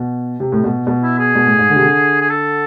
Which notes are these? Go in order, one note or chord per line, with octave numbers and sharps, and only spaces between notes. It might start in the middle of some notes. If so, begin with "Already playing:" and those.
Already playing: B2
C3
A2
B2
B2
E4
G#4
B2
A2
G#2
D3
C3
D3
G#4
A4